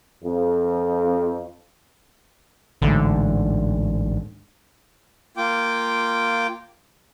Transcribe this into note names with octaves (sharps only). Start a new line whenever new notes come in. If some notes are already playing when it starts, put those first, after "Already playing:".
F2
A1 D2 G#2 D3
A#3 F4 G5 D6